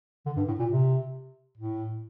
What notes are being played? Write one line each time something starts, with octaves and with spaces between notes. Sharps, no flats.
D3
G2
A2
A#2
C3
A2